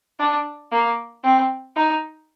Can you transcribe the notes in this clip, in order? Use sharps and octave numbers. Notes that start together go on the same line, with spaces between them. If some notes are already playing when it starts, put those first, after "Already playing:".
D4
A#3
C4
D#4